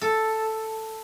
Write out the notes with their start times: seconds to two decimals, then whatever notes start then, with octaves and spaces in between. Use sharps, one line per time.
0.01 A4